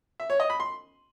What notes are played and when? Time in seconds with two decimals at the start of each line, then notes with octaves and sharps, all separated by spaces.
0.20 E5
0.30 C#5
0.40 D#5
0.50 B5
0.60 C6